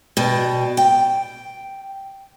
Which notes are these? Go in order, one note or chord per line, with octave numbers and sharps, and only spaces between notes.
B2 G3
G5